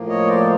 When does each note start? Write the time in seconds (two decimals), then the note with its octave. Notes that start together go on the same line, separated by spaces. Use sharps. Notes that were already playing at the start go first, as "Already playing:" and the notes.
Already playing: A2 F3 A#3
0.08 C#5 D#5
0.27 C5 D5